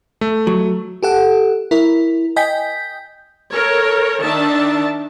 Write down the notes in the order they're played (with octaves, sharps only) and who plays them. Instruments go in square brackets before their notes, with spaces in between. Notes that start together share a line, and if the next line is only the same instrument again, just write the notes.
[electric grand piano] A3
[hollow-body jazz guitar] F#3
[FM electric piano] G4 A4 F#5
E4 A#4
D#5 G5 G#5 G6 B6
[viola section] A4 A#4 C#5
D#3 D4 E5 A5